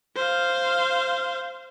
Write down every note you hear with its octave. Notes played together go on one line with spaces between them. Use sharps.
C5 F5